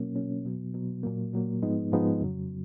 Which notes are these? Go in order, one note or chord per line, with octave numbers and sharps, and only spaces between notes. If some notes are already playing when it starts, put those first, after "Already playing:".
Already playing: B2 F#3 A#3 C#4
B2 F#3 A#3 C#4
B2 F#3 B3
B2 F#3 B3
A#2 F#3 A#3
A#2 F#3 A#3
G#2 F3 G#3 B3 D#4
G#2 F3 G#3 B3 D#4
F2 C#3 F#3